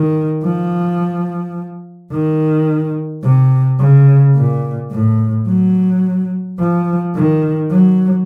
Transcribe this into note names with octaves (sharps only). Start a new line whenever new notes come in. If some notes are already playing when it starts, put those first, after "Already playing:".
Already playing: D#3
F3
D#3
C3
C#3
A#2
A2
F#3
F3
D#3
F#3